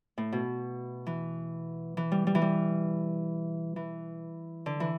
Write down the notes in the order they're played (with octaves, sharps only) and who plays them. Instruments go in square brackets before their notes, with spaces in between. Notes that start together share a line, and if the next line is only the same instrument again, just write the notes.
[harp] A2
B2
E3
E3
G3
G3
E3
G3
E3
D3
E3